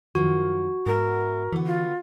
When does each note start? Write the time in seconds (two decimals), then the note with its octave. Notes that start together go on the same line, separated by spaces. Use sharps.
0.15 F#2 D#3 F3 F#4
0.86 G#2 B3 A#4 E5
1.52 D3 E3 B3
1.66 F4